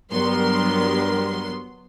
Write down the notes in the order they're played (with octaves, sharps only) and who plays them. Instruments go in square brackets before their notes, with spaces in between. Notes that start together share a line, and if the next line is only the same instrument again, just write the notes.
[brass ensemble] G2 G3 A#4 [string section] F#3 B3 C6